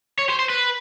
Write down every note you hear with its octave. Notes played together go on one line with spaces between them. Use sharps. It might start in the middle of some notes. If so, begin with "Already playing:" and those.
C#5
C5
C5
B4